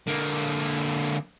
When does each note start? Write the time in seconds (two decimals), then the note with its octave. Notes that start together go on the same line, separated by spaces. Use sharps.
0.07 D3 A#3